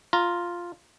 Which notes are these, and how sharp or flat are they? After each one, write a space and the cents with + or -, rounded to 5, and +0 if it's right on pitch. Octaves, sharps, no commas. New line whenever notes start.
F4 +0 A#5 +5